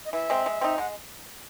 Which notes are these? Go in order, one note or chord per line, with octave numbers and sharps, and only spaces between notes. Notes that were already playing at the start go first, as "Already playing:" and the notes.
D#5
E3 E5
G#3 C4
G#3
C4 D#4
G#3 F#5